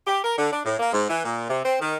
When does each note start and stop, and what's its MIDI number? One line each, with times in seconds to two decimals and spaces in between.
0.07 0.20 67
0.24 0.37 70
0.38 0.51 50
0.53 0.60 62
0.65 0.76 45
0.79 0.90 58
0.93 1.05 44
1.10 1.25 52
1.25 1.46 46
1.49 1.61 48
1.65 1.77 60
1.81 1.96 51